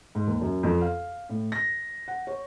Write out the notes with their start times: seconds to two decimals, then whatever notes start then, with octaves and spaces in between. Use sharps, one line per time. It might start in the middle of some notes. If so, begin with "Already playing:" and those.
0.15 G#2
0.27 D#2
0.42 F#2
0.63 F2
0.81 F5
1.29 A2
1.52 A#6
2.08 F#5
2.27 C#5